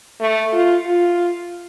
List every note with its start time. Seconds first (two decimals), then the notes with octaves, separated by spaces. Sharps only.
0.20 A3
0.52 F4
0.86 F4